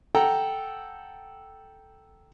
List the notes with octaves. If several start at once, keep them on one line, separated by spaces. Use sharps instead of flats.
A4 F#5 G5 A#5